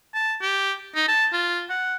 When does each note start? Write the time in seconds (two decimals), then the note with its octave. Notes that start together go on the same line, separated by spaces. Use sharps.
0.14 A5
0.41 G4
0.95 D#4
1.08 A5
1.33 F4
1.69 F#5